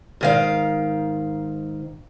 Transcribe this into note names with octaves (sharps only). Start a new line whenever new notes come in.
G#2 D#3 F5